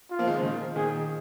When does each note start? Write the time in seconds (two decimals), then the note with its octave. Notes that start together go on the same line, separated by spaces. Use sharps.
0.11 F4
0.19 F3 A#3
0.27 D#3 G#3
0.35 C#3 F3
0.43 A#2 D#3
0.76 A#2 D#3 G#4